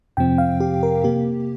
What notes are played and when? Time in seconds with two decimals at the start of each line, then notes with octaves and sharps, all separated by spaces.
0.17 F2 C3 F3 C4 G5
0.38 F5
0.60 G4
0.83 A#4
1.04 C3 A#3 G4